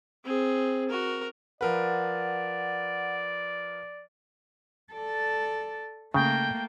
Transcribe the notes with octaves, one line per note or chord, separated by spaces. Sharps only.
C4 G#4
F#4 A#4
F3 A#4 B4 D5 F#5
A4 D5
C#3 A3 A#3 G5